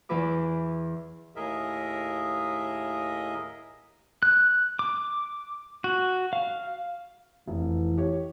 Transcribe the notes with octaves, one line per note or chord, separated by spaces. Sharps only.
E2 E3 E4 B4 D6
D#2 A2 G#4 A#4 D#5 E5
F#6
D6
F#4
F5
F1 E3
G4 C#5